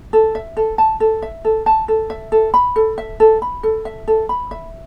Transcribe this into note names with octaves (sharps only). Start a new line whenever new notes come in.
A4
E5
A4
A5
A4
E5
A4
A5
A4
E5
A4
B5
A4
E5
A4
B5
A4
E5
A4
B5
E5